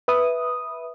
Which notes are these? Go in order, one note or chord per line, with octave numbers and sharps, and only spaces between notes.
B4 E5 D#6